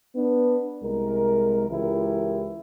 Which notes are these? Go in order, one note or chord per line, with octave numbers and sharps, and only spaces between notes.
B3 D4
C2 G#3 A#4
C#2 E3 E4 G4 A#4